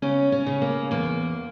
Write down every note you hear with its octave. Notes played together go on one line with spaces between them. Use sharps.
C#3 C#4
C#4
C#3
A#3
E2 A#3